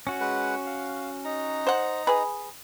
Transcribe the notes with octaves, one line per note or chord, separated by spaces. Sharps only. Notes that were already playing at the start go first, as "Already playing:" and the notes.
C#4 F#4
G#3 B4 F#5
F5
D#4 A#5
C5 F#5
G#4 B4